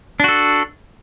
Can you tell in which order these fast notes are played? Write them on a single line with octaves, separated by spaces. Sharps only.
D4 F#4 A4